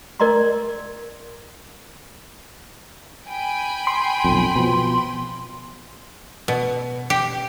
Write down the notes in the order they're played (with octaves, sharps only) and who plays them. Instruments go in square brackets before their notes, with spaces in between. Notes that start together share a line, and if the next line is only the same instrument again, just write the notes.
[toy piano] A#4 D5 D#5 A#5 C6
[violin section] G5 G#5 B5
[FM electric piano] C6
[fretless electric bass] B1 F2
B2 F3
[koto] B2
G4